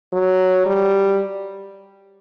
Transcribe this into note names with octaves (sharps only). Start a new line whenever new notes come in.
F#3
G3